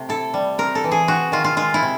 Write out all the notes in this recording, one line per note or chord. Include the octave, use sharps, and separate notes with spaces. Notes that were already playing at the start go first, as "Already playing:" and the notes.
Already playing: C3 A3
E4 A4
G3
C4 A#4
A4
E3
G#4
C4 F#4
D#3 F4
F4
G#3 F4
E4
C3